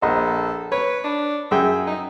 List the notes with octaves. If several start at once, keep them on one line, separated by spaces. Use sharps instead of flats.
A#1 A4 D#5
B4 C#5
D4
F#2 G#4 E5 G5
D#4